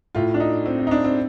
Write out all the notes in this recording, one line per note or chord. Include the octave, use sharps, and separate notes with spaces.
A2 F4
D4
D#4
C4
C4
D#4
D4
C4